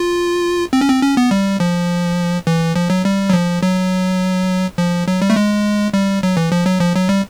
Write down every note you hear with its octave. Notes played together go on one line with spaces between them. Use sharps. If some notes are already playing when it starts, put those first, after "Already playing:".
Already playing: F4
C4
C#4
C4
C#4
B3
G3
F3
E3
F3
F#3
G3
F#3
F3
F#3
F3
F#3
G3
A3
G#3
G3
F#3
E3
F3
F#3
F3
F#3
G3